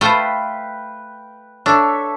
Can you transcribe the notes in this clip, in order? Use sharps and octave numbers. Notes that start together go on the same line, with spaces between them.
A3 F4 B4 C5 G5
D4 A4 C#5 E5